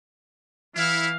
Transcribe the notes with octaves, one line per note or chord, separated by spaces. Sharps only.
E3 E4 F5